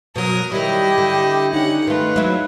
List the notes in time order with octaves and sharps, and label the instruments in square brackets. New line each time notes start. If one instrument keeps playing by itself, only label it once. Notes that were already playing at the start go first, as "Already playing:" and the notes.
[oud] B2 F#3 [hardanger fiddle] A#4 D#6
[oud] D#3 F#3 G3 [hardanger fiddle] E4 D#5 [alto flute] G4
[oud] D3
[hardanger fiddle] C#4 F#5 [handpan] D#4
[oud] D#3 A3 [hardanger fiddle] F4 [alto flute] B4
[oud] F#3 E4 [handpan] G#3